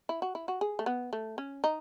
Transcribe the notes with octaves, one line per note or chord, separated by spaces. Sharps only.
E4
F#4
E4
F#4
G#4
A3
B3
A3
C#4
D#4